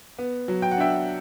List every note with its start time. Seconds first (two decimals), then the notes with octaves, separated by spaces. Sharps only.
0.18 B3
0.48 F#3
0.62 G5
0.71 F#5
0.77 D4 E5 G5